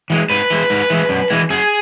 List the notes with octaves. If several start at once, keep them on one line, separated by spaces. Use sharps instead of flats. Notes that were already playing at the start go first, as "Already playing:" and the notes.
E3 G#3
G#2 B4
E3 G#3
G#2
E3 G#3
F#2
E3 G#3
F#2 G#4